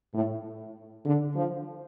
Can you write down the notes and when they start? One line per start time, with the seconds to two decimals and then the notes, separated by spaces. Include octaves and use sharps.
0.15 A2
1.05 D3
1.35 F3